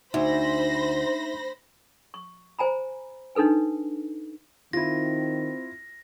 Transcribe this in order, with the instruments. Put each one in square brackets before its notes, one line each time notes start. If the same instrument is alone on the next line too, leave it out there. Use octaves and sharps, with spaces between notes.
[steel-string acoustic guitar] D2 [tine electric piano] D#4 E5 [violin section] C5 B5 A#6
[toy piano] C#6
C5 G#5 A#5 B5
D4 D#4 A4 B4 G#5
[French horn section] D#3 [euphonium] C4 [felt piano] E4 F4 [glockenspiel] A#6